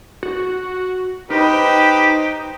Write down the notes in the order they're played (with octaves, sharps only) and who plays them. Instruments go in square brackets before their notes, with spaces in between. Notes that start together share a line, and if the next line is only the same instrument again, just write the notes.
[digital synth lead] F#4
[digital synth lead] D#4 [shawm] G4 [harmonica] B4 C5 [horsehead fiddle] D#5 G5